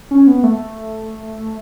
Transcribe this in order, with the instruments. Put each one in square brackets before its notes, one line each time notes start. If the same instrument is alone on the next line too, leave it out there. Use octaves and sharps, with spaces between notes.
[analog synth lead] C#4
B3
A3